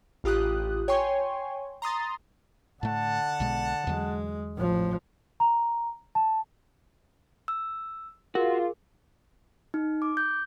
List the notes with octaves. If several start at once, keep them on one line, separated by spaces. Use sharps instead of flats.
A1 F4 G4 D#6 F#6
C#5 G5 G#5 C6 C#6
A#5 C6 D#6 A6
A2 D3 A3 F#5 A5
B1 B2 G#3
E2 D3 F#3 G#3
A1 F3
A#5
A5
E6
F4 F#4 G#4 A#4
D#4
D6
G6